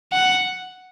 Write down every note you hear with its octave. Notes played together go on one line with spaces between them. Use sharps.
F#5